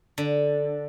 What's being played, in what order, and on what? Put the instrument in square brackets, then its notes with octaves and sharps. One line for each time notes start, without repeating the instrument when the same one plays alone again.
[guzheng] D3